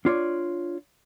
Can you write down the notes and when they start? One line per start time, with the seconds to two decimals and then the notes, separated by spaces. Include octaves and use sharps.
0.05 D4 F4 C#5 D5